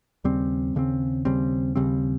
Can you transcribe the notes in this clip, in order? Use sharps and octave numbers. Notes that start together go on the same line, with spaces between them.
D#2 C#3 G3 C4
D#2 C#3 G3 C4
D#2 C#3 G3 C4
D#2 C#3 G3 C4